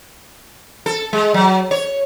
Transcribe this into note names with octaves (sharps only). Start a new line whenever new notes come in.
A4
G#3
F#3
C#5